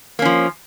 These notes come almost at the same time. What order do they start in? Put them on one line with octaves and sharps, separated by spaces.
A#3 C#4 F3